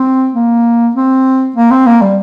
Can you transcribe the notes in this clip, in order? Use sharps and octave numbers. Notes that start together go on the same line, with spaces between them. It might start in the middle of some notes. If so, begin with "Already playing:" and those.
Already playing: C4
A#3
C4
A#3
C4
A#3
G3